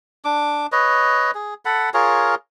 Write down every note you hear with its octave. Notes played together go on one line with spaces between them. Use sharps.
D4 D6
B4 C#5 D#5
G#4
A4 F#5 B5
F4 G#4 A#4 C#5